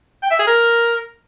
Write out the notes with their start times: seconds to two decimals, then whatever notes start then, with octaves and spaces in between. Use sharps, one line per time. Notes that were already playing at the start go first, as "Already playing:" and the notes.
0.23 G5
0.31 E5
0.39 G#4
0.47 A#4